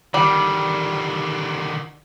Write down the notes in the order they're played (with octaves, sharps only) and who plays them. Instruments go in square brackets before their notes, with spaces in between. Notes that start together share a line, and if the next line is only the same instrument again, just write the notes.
[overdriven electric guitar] D3 D#3 [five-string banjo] G3